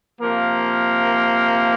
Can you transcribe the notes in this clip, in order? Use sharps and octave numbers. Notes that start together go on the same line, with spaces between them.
C3 F3 A#3